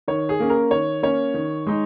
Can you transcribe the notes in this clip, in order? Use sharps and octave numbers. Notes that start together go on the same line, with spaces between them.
D#3 C#5
G#4
A#3 C#4
A#4
D#3 C#5
A#3 C#4 C#5
D#3
G#3 D#4